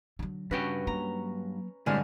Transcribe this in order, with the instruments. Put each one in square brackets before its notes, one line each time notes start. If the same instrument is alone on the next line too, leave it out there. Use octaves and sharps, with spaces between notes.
[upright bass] D3 F#3
[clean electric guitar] G2 F#4 G5 [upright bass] C#3 [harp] C#4 B4
[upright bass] F#3 A#3 [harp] A#5
[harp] G1 G#3 [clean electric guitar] A2 C3 G3 [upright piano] D4 G#5 F6